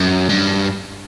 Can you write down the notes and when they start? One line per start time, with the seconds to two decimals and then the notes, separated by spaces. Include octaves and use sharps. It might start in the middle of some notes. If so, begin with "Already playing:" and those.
Already playing: F#2
0.29 G2